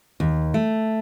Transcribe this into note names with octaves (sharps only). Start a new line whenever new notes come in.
D#2
A3